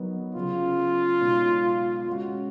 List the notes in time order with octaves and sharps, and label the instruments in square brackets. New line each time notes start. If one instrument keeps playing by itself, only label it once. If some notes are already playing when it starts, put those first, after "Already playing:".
Already playing: [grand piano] F#3 B3 D#4 A#4
[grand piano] C#3 F#3 C#4 G#4 [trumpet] F4
[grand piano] B2 G#3 D#4 F#4 C#5
G#3 C#4 F#4